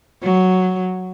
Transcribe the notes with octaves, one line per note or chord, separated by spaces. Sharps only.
F#3